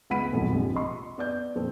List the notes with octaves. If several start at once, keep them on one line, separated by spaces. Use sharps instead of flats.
C#2 B3 F#5 B5 B6 D#7
D#1 B1 F2
A#1 G#2 C3
D#5 C6 C#6
B3 D5 G6
F2 A#2 C4